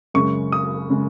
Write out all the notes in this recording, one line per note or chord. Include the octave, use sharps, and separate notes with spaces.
F#2 C#3 G#3 C#6
D#6
C#3 G#3